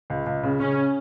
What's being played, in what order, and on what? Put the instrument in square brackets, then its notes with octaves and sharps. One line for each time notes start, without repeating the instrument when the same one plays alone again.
[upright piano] C#2
C#2
C#3
[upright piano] C#3 [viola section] C#4